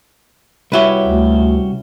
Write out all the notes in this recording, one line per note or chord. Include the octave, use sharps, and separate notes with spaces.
C2 C#4 E4 F#4 G4 B4
D2